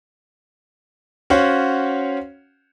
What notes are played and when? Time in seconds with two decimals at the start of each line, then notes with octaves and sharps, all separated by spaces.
1.30 C#4 F#4 C5 C#5 F5 F#5